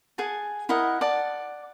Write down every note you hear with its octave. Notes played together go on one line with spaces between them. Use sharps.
G#4 F#5 G#5 A5
E4 A#4 D#5 F#5
D5 F#5 A5